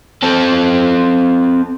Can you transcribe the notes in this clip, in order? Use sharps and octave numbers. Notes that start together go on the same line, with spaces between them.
C4 A4